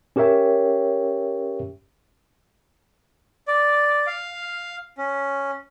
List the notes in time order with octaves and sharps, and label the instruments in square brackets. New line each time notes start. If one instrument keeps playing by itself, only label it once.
[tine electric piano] C#4 G4 A#4 C#5 E5 G5
[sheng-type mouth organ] D5
F5
C#4